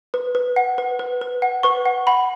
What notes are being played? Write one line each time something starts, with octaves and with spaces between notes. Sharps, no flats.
B4
B4
F#5
B4
B4
B4
F#5
B4 C#6
F#5
F#5 B5